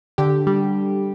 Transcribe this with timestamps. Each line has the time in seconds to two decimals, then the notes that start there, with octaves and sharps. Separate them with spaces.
0.18 D3 G4
0.47 G3